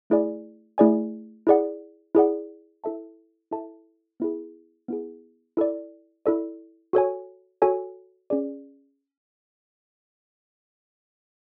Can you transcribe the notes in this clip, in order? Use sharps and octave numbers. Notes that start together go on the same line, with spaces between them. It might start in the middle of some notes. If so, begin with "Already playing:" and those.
A3 E4 G#4 D5 G#5
A3 E4 G#4 D5 G#5
E4 G#4 D5 F#5
E4 G#4 D5 F#5
E4 A4 E5 A5
E4 A4 E5 A5
B3 E4 G#4
B3 E4 G#4
E4 A4 D5
E4 A4 D5
F#4 A4 C#5 G#5
F#4 A4 C#5 G#5
C#4 G#4 D5